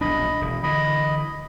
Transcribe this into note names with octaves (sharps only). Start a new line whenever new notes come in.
D#1 B1 D4 D#5 B5
E1
D3 E3 D#5 B5